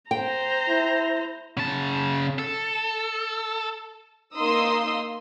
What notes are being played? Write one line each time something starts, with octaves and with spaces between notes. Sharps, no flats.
C5 G5 A#5
E4
C#3 A5
A4
A#3 D#4 A#4 C6 D#6 E6